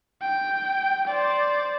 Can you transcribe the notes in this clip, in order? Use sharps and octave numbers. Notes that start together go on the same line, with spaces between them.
G5
C5 D5